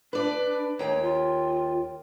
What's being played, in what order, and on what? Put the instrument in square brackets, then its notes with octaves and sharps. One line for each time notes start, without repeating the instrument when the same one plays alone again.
[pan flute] D4 [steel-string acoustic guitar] B4 D5
[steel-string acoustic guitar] D#2 G5 [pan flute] C#5
[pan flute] F4